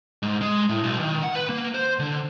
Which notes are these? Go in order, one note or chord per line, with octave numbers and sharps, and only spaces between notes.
G#2
G#3
A2
B1
D#3
F#5
B4
A#3
C5
D3